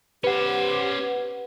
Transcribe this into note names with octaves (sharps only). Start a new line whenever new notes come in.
C#4 G4 B4 C5 F#5